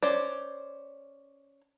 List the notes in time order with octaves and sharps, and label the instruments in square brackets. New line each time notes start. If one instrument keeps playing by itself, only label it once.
[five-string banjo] C#4 C5 D5